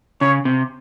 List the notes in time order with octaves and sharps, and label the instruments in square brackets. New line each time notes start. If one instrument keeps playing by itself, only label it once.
[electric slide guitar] C#3 [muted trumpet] C#5
[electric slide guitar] C3